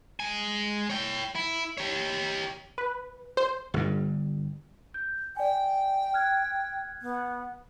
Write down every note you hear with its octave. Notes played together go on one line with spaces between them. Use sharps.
G#3 G#5
C#5 G5
E4
G4 C#5
B4
C5
G1 G2
G6
D5 G5 G#5
F6 F#6 G#6
B3